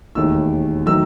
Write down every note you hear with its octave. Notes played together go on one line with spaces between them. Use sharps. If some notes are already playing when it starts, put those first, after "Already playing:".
E1 D#2 D#3 A3 E6
D#3 F#3 A3 E6